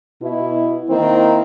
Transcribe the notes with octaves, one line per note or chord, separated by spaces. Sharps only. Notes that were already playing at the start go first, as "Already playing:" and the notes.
B2 E4
D#3 A#3 C4 E4